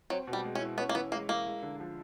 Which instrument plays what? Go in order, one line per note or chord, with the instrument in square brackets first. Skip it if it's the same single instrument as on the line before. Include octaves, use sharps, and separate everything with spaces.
[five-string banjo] F#3 [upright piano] C4
[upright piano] B2
[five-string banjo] G3
[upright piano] G#3
[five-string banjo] C#4
[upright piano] E4
[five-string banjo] B3 [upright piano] C#4
[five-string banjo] A#3
[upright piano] E3 [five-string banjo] B3
[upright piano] G#3 [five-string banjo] A#3
[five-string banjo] A#3 [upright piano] E4
[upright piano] G#3
D3
F3